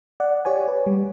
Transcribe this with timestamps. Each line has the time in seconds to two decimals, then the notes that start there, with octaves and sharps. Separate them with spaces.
0.20 D5 F#5
0.45 G4 C#5 D5 G#5
0.68 B4
0.86 G3